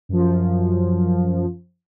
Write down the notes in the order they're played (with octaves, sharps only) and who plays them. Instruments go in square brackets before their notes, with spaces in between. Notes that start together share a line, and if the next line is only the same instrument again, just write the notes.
[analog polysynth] F#2 F3